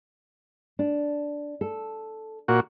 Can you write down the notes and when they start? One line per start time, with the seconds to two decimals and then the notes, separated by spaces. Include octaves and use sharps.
0.79 D4
1.61 A4
2.48 A#2 F#4